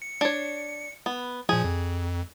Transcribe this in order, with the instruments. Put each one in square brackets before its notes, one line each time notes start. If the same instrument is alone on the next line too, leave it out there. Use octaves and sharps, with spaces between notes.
[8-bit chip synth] C#7
[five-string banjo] D4 C#5
B3
[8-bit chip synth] A#2 F3 [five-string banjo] G#4
[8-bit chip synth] F2